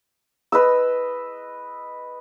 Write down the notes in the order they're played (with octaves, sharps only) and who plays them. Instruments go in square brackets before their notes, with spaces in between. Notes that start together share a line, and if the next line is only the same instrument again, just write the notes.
[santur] B4 D#5 E6